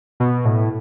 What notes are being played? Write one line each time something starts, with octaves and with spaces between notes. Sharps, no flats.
B2
A2